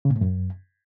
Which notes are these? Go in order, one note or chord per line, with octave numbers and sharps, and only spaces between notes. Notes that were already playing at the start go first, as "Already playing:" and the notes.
C#3
A#2
A2
F#2